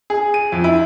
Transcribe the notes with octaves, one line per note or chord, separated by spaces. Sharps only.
G#4
D#7
F2
E4